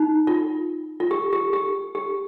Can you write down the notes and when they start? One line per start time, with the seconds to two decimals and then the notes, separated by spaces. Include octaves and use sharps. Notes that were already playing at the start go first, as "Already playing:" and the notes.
Already playing: D#4
0.27 F4
1.00 F4
1.11 G4
1.33 G4
1.53 G4
1.95 G4